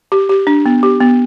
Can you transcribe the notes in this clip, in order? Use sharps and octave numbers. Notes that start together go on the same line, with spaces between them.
G4
G4
D4
B3
G4
B3